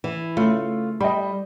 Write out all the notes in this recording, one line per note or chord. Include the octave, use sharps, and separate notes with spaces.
E3
C#3 A3 F4
G3 D#5 G5 B5